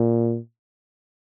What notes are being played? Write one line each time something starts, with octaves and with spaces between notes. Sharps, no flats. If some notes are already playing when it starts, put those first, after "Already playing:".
Already playing: A#2